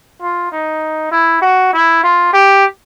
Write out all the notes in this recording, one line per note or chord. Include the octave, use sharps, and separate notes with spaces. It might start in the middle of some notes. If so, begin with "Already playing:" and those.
F4
D#4
E4
F#4
E4
F4
G4